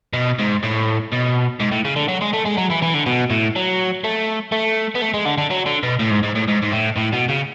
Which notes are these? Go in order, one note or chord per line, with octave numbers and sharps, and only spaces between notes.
B2
G#2
A2
B2
G#2
A2
C#3
D3
F#3
G#3
A3
G#3
F#3
E3
E3
D3
B2
A2
F#3
A3
A3
B3
A3
G#3
D3
D3
F#3
D3
B2
A2
G#2
G#2
A2
G#2
G#2
A2
A2
B2
C#3